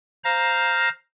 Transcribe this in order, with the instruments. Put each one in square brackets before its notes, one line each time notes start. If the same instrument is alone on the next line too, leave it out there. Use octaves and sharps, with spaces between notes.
[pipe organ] C5 F5 A#5 F6 A#6